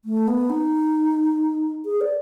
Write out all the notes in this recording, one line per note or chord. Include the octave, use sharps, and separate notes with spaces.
A3
B3
D#4
G#4
D5